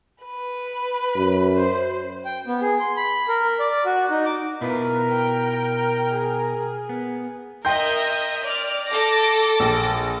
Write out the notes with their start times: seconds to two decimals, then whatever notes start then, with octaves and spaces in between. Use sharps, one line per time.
0.24 B4
1.15 F#2
1.56 C5
2.25 G5
2.47 B3
2.61 G#4
2.80 C6
2.97 B5
3.28 A#4
3.60 D5
3.85 F#4
4.10 D#4
4.26 D6
4.61 B2 E4 F4 A#4 B4
5.10 G5
6.14 G#4
6.89 B3
7.65 A#4 D#5 E5 G5 C6 G6
8.43 D5 F6
8.88 A4 D6 A#6
9.60 A#1